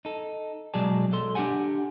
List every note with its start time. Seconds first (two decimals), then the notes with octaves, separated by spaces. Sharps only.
0.05 D#4 A4
0.74 B2 F#3 G#3 G#4 D5 A5
1.12 B1 A4 C6
1.35 D4 F4 G4 F#5 G#5